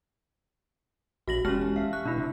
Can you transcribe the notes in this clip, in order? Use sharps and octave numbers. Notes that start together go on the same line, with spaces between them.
A#1 F#4 A#6 F#7
E1 G#3 C#4 G4 A5 F6
E5 F5
C#6 F#6
B2 D4 E4
C3